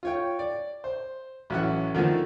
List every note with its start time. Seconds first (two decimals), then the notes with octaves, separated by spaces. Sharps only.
0.03 F4 C#5 G5
0.39 D5
0.84 C5
1.50 A1 F#3 E4 C#5 F#5
1.94 D3 D#3 F3 A3